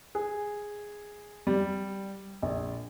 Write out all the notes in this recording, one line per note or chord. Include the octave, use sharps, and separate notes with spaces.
G#4
G3
A#1